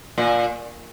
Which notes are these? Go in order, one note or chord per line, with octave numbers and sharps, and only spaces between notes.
A#2